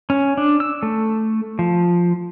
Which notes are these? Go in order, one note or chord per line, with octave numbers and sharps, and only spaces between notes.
C#4
D4
E6
A3
F3